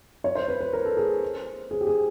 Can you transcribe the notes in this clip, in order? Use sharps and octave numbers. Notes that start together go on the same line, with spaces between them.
C#5
C5
B4
B4
A#4
A4
G#4
G#4
G4
G#4